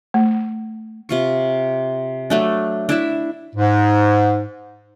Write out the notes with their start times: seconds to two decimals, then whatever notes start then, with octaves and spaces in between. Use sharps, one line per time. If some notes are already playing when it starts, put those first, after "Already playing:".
0.14 A3
1.09 C3 F4 C#6
2.30 F#3 A3 D4
2.89 D4 E4 E5
3.56 G#2